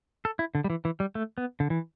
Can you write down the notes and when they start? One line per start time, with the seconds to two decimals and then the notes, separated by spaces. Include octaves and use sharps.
0.25 A4
0.39 E4
0.55 D3
0.64 G3
0.70 E3
0.85 E3
1.00 G3
1.15 A3
1.38 B3
1.60 D3
1.70 E3